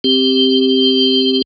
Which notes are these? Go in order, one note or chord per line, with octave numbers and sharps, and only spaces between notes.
C4 G4